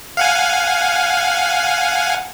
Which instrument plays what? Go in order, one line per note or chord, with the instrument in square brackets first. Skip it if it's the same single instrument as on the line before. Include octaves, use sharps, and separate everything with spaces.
[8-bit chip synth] F5 F#5 G#5